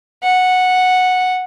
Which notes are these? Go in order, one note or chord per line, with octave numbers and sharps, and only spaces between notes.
F#5